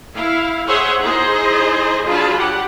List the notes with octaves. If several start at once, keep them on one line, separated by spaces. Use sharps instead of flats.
E4 F5
G#4 C5 C#5 E5 F#5 C6
D#4 E4 G#4 C5 D#5 C6
F#3 D4 F4 G#4 A5 B5
G4 F#5